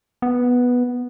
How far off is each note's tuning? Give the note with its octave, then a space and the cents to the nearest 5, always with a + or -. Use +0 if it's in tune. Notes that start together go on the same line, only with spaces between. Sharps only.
B3 -5